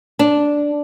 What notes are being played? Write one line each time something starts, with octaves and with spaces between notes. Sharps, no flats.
D4